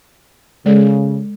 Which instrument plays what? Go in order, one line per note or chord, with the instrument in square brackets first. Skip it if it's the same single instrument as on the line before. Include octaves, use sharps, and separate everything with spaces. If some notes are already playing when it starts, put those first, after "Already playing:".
[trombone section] C#3 [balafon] G#3 A4 D5